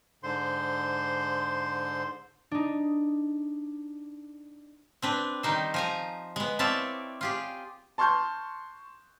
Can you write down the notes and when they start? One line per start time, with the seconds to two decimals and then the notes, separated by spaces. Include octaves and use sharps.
0.23 G#2 D3 C5 C6
2.51 D4 D#4
5.02 C4 D4 B4
5.43 D#3 G3 D#4 C5
5.74 F3 G#5 A#5
6.36 G#3 B3
6.59 C4 E4 C#5 D5 F5 A5
7.21 F4 G4 G#4
7.98 A5 C6 C#6 F6 G6